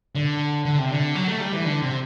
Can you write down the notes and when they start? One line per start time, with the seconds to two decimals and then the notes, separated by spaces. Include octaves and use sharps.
0.15 D3
0.65 D3
0.78 C3
0.91 D3
1.15 F#3
1.28 A3
1.40 G3
1.53 E3
1.65 D3
1.82 C3